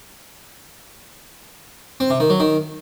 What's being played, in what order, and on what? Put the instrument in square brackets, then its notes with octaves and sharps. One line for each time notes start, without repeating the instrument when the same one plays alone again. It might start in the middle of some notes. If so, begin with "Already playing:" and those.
[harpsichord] C4
C3
D#3
F#3
D#3